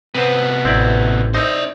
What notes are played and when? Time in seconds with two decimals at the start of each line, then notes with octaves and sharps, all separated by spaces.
0.14 C3 B3 B4 C5
0.65 A1 C4 E4 D5
1.35 C4 D#4 C5 D5